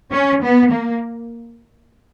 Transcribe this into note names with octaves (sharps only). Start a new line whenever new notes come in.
C#4
B3
A#3